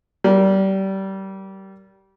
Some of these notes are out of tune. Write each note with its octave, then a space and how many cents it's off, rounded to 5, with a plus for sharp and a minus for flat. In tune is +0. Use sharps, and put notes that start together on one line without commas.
G3 -25 A#4 +0